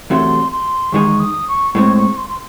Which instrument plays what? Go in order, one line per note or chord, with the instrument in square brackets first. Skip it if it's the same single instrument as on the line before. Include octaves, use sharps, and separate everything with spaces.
[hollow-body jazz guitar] E2 C3 F#3 A3 [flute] C6
[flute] C6
[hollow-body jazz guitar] E2 D#3 G#3 D#4 G#4 [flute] C#6
[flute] D#6
C#6
[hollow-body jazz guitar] A2 G#3 C4 [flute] C#6
[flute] C#6
C6
C6